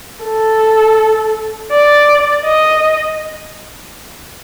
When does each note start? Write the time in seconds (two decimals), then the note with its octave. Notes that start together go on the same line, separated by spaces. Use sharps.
0.24 A4
1.72 D5
2.45 D#5